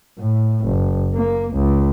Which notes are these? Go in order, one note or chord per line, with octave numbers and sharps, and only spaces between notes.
A2
F#1
A#3
C#2